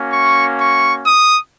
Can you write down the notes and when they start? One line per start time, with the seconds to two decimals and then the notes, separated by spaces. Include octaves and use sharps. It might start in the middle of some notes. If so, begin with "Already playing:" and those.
Already playing: A#3 C#4 F#4
0.13 C#6
0.60 C#6
1.06 D#6